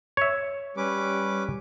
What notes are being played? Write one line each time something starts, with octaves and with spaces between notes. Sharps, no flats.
C#5 E5
G3 C#4 B4 D6